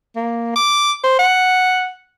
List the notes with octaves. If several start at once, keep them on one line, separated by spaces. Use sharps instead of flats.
A#3
D6
C5
F#5